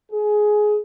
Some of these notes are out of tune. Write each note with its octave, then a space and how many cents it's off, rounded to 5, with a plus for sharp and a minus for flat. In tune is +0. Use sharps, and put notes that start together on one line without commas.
G#4 +15